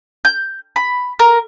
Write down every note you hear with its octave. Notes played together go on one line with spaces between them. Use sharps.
G6
B5
A#4